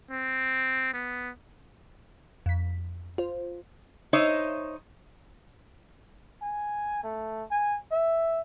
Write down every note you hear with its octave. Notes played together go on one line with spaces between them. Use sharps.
C4
B3
F2 B6
F4 C5
D#4 C5 C#5 D#5 E5
G#5
A3
G#5
E5